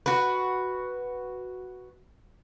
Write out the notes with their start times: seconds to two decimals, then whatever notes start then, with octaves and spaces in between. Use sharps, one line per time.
0.06 F#4 B4